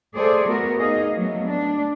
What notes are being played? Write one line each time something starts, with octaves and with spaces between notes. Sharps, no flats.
A3 G#4 A4 C5 D5
A3 B3 F#4 A#4
D#4 G#4 D#5 F5
F#3 A3 B3
D4